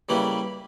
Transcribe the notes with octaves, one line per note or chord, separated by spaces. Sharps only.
C#3 G3 A#3 E4 B4